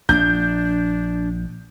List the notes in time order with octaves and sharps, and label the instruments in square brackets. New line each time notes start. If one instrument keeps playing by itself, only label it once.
[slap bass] A#1 [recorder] D4 [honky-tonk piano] G6